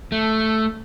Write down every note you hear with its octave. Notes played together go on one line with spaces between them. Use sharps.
A3